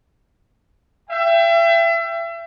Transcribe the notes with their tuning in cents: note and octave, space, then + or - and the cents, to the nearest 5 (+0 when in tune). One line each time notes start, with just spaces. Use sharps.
E5 +35 G5 +0